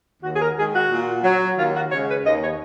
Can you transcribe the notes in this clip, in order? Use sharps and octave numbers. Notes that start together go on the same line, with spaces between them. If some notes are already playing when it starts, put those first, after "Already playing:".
D#2 F#4
G#4
A#4
D#3 G#3 G#4
F#4
A#2
F#3
D#2 F4
F#4
C#3 G#3 C#5
B4
D#2 D#5
C#5